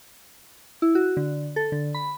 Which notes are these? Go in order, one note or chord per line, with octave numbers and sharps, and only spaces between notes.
E4
F#4
D3
A4
D3
B5